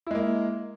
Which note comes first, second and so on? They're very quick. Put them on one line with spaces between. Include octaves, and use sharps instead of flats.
E4 G#3 A#3